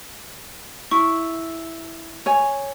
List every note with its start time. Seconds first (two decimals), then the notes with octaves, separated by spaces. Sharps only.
0.91 E4 C#6
2.26 C#5 G#5